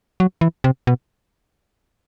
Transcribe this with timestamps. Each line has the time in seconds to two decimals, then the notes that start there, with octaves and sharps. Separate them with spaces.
0.20 F#3
0.41 E3
0.64 C3
0.87 B2